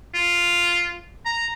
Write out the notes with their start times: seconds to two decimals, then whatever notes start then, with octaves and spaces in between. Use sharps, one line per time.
0.15 F4
1.25 A#5